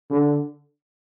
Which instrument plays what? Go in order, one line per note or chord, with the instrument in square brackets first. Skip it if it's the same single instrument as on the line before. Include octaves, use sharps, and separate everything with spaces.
[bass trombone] D3